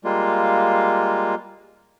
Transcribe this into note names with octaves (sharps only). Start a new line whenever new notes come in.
G3 G#3 A#3 F4